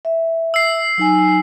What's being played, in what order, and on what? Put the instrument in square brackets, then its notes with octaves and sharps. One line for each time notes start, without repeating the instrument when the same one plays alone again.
[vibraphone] E5
[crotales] E6 C7
[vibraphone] F#3 D#4 G#5